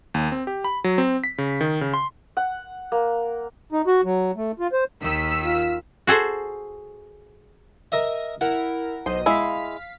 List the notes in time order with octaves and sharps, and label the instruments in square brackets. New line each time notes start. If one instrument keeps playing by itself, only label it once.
[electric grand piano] D#2
C4
G4
B5
F#3
C4
B6
C#3
D#3
C#3
C6
[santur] F#5
A#3
[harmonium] D#4
F#4
F#3
A3
F4
C5
[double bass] D#2 [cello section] D#3 [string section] E6 B6
[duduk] F4
[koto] F#4 G#4 A4 C5
[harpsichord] A#4 D#5 E5
[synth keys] E4 A#4 [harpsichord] F#5
[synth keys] B1 D#5 [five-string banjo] C5
[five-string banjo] G#3 E4 [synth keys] F5 B6